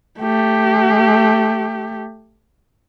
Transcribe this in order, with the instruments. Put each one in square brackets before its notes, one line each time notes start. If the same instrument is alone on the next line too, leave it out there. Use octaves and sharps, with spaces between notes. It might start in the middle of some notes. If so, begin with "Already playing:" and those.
[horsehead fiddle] A3 G4